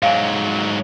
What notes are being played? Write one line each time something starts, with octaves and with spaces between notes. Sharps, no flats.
G#2 F#3 F5 G#5